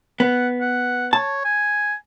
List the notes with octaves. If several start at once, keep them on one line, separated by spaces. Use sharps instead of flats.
B3 F#5
F#5
C#5 A5
G#5